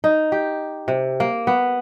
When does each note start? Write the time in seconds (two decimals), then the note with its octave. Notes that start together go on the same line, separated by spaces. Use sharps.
0.04 D#4
0.32 G4
0.88 C3
1.20 A#3
1.47 B3